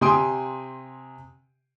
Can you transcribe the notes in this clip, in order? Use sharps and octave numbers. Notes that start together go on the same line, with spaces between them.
C3 G4 G#5 C6 D#6 D7